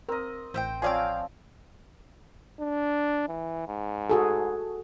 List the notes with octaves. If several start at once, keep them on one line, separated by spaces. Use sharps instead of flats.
C4 A#4 D#5
A1 C5 E5 G5
F3 C4 G#4 C#5 D5 F5 G5 G#5
D4
E3
G#2
F#4 G#4 A4